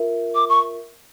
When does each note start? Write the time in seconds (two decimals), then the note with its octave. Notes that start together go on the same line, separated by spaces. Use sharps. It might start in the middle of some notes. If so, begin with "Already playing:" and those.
Already playing: F4 A#4 E5
0.35 D6
0.49 C#6